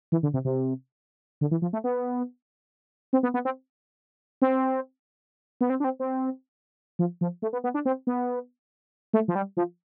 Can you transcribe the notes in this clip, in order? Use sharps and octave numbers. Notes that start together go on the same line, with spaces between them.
E3
D3
C3
C3
D3
E3
F3
A3
B3
C4
B3
B3
C4
C4
B3
C4
D4
C4
C4
F3
F3
A3
B3
B3
D4
C4
B3
A3
F3
G3
F3